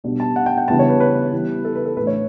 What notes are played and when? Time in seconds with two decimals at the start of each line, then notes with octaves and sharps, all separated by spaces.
0.04 B2 G3 B3 D4
0.20 A5
0.36 F#5
0.46 G5
0.58 G5
0.68 C#3 E3 G3 B3 D4 A5
0.79 C#5
0.89 B4
1.00 B4
1.33 E3 G3 B3
1.65 A4
1.75 B4
1.85 A4
1.97 A2 E3 A3 D4 B4
2.07 C#5